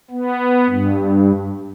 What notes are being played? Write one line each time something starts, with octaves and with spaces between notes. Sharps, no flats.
B3
G2